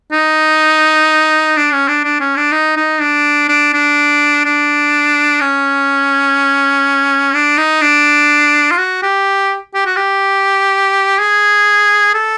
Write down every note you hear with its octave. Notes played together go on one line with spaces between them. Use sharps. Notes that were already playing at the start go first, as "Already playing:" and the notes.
D#4
D4
C#4
D4
D4
C#4
D4
D#4
D#4
D4
D4
D4
D4
C#4
D4
D#4
D4
F4
F#4
G4
G4
F#4
G4
G#4
A4